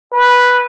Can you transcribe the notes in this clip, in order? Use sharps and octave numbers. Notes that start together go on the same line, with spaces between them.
B4